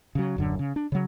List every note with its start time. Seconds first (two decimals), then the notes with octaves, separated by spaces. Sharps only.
0.15 C#3 F#3
0.36 D#1 F#2 D3
0.59 C#3
0.76 D4
0.92 C#3 F#3